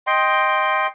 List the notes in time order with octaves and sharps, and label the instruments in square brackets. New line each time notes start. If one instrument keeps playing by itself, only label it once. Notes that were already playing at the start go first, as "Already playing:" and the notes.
[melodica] D#5 G5 C6